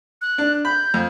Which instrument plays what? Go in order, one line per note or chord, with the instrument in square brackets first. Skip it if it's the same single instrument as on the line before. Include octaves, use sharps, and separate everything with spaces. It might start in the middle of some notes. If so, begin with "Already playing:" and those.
[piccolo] F#6
[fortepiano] D4
[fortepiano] B5 [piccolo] G6
[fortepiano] F2